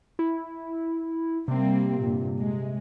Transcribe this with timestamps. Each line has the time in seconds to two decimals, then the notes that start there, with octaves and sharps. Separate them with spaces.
0.19 E4
1.48 C3 G3 A#3 C4
2.00 G2 A#2
2.39 G#3